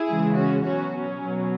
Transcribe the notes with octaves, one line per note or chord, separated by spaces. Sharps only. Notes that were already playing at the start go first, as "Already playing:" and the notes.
Already playing: E4 G#4
C#3 E3 G#3
C#4 F#4
B2 F#3 C#4 F#4
C#4
B2 F#3